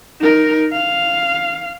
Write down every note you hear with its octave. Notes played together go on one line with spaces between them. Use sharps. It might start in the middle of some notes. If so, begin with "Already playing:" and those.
D#4 A#4
F5